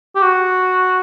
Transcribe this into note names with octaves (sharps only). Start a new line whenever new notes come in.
G4
F#4